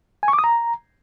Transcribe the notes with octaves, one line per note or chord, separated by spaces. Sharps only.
G#5
C#6
D6
D#6
A#5